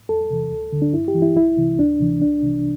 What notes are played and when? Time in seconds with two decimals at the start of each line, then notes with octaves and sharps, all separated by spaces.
0.09 E2 A4
0.30 C3 E3
0.51 D2
0.72 D3
0.82 D4
0.93 G2 E4
1.08 G4
1.15 E3
1.22 E4
1.36 C2 E4
1.57 C3 E3
1.78 D2 D4
2.00 C3 E3
2.21 C2 D4
2.43 C3 E3